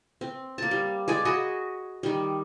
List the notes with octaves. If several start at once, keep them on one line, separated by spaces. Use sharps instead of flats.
C4
A#3 A5
G3
G#3 G#4 D5
F#4 G#4 D#5 B5
D#3 G3